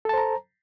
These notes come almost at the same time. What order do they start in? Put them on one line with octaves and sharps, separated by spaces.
A4 A5 C5 A#5